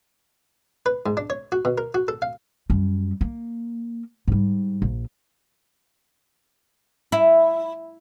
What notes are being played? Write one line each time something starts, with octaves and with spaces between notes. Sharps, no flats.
B4
G#2
D4
C#5
F#4
B2
A#4
F#4
A4
F5
F#2 G3
A#3
G#2 G3
A#1
E4